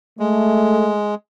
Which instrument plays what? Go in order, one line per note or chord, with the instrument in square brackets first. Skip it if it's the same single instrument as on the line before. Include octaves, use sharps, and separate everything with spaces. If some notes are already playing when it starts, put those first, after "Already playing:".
[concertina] G#3 [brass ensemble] A3